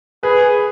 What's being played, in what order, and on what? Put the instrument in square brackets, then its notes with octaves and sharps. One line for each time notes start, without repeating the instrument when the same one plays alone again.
[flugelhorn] G#4 [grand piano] B4